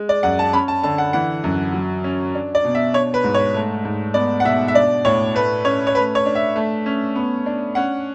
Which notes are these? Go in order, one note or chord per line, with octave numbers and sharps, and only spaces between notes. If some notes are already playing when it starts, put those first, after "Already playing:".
Already playing: G#3
D5
F#2 F#5
A5
C#4 B5
A5
D3 A5
F#5
E3 F#5
F#2
F#3
C#4
D4
D5
B2
E5
D4 C#5
B4
G#2
C#5
A3
G#2
B3 D5
F#5
B2 E5
E5
D4 D5
A2 C#5
A3 B4
C#4 C#5
C#5
A3 B4
C#5
D4
E5
A3
C#4
B3
D4
C#4 F#5